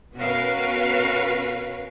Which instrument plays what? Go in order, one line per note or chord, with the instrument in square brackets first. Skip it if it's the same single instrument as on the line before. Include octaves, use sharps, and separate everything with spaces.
[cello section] B2 C#4 F#4 A#4 B4 F5